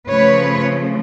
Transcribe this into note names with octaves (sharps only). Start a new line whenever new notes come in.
C#3 F3 A3 B4 C#5